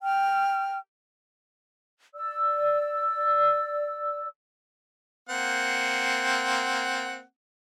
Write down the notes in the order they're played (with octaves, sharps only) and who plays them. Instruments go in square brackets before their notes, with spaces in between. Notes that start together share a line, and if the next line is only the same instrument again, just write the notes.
[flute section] G5 F6
D5 E6
[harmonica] A#3 C4 F#5